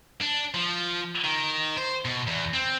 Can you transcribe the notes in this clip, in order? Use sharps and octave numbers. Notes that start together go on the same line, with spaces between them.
D4
F3
D#3
C5
B2
E2
C4